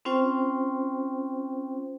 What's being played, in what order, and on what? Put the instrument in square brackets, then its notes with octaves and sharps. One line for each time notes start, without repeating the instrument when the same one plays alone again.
[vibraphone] C4 C#4 F4 C5 G5